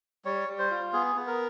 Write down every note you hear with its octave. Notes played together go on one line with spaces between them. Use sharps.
G3 C#5
G3
C5
F4
B3 G#4
B3
A#4